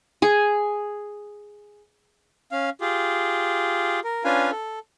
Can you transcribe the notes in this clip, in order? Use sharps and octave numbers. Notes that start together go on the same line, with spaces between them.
G#4 G#5
C#4 F5
F4 G4 G#4
A#4
C#4 D4 F4 B4 F5 G#5
A4